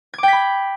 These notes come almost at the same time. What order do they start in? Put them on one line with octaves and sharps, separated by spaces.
G#6 D6 G5 B6 B5